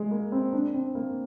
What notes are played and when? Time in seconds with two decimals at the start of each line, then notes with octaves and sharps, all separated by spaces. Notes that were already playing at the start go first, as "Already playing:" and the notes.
Already playing: G#3
0.11 A#3
0.32 C4
0.53 D4
0.74 C4
0.95 A#3